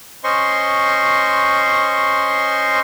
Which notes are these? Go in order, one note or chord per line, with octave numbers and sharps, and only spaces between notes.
C#4 C5 D#5 C6 C#6